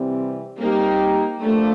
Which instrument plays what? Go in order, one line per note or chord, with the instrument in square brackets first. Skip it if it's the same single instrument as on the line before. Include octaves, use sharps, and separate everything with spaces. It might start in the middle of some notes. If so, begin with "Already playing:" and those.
Already playing: [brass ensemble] C3 E3 G3 C4
[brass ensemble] G3 C4 D#4 G4 [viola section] A#3
[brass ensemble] F3 A#3 D4 [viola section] A3